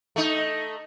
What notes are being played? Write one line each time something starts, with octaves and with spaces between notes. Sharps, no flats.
A3 D#4